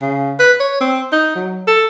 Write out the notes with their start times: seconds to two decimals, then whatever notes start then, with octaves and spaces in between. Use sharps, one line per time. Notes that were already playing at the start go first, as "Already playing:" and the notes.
0.02 C#3
0.39 B4
0.60 C#5
0.81 C4
1.12 D#4
1.35 F#3
1.67 A4